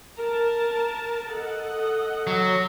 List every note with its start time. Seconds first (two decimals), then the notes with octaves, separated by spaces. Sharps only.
0.20 A#4 A5
1.31 A4 D#5 F#5
2.27 F#3